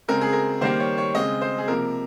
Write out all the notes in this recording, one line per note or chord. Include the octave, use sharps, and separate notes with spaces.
C#3 G#3 C4 A#4
G#4
A#4
D#3 G3 A#3 C5
C#5
C#5
C#3 G#3 C4 D#5
C5
G#4
C3 F3 A#3 A#4